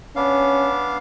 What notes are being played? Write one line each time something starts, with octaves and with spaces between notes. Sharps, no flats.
B3 C#4 D4 F5